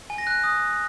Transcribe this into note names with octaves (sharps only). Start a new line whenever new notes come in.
G#5
A#6
F#6
A#6
D#6